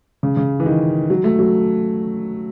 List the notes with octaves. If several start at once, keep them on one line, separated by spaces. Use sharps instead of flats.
C#3
C#3
E3
D#3
F#3
A3
F#3